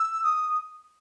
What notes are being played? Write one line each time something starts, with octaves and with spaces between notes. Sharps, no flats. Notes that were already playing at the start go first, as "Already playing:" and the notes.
Already playing: E6
D#6